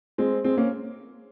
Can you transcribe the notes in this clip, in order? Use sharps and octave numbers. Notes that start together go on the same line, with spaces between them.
G#3 C4
G#3 C4
A#3 C#4